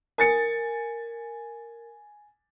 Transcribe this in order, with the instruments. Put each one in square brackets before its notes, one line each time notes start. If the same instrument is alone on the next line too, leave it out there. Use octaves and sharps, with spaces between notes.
[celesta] A#4 [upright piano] G#5 A6 C#7